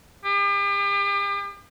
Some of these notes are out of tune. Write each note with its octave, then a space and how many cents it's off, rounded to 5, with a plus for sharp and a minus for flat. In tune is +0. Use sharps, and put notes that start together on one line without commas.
G4 +40